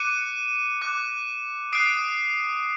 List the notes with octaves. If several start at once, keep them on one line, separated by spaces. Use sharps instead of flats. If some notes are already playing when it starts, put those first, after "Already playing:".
Already playing: D6 F#6 C#7 D#7
D6 F#6
D#6 F#6 C7 D7